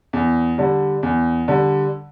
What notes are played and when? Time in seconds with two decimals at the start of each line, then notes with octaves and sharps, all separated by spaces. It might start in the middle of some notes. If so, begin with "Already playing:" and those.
0.13 E2
0.58 D3 G3
1.03 E2
1.48 D3 G3